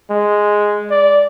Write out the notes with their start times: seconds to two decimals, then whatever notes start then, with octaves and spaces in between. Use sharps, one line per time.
0.10 G#3
0.90 D5